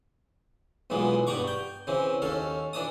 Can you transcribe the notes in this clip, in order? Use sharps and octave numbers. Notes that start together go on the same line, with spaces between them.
B1 A#2 E3 G#3 B3
G2 G3 B3 A#5 C#6 D6
G5
C#3 E3 C4
D#2 C#4 A4 F5
E3 D4 A5 D#6